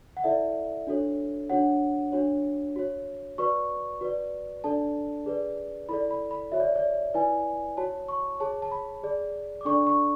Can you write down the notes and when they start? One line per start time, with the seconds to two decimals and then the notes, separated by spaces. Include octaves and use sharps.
0.17 F#5
0.24 E4 A4 D5 E5
0.87 D4 F#4 A4 C#5
1.50 D4 F#4 C#5 F#5
2.12 D4 F#4 C#5
2.76 F#4 C#5
3.38 F#4 B4 D5 C#6
4.01 F#4 B4 D5
4.64 D4 A4 D5 A5
5.26 G#4 B4 D5
5.89 E4 A4 D5 B5
6.11 B5
6.31 B5
6.52 F#4 C#5 E5
6.60 D5
6.76 D5
7.14 E4 B4 D5 G#5
7.77 F#4 C#5 A5
8.08 C#6
8.40 G#4 C#5 A5
8.62 A5
8.71 B5
9.03 G#4 D5
9.61 D6
9.65 D4 A4 D5 C#6
9.87 C#6